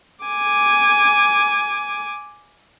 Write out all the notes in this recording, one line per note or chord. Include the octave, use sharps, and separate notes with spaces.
G#5 D6